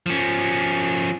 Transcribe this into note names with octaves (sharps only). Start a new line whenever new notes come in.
F3 C#4